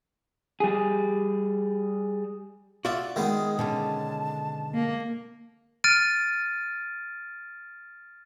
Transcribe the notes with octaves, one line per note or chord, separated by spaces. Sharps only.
G3 G#4
F4 F#4 D5 E5
D#3 G#3 B3 G#4
B2 D3 C#4 A5
A#3
F6 A6 D7 D#7